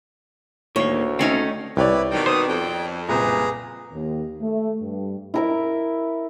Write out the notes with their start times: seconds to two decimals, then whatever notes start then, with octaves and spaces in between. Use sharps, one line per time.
0.76 D2 A2 D#3 A#3 C#5
1.19 A3 C4 C#4 D#4
1.77 C2 E4 G4 B4 C#5 D5
2.11 B2 D#3 G5
2.26 C5 D#6
2.48 F2 G5
3.08 F#1 C2 A#2 G#4 B4 A#5
3.92 D#2
4.40 A3
4.81 G2
5.34 E4 A#4 E5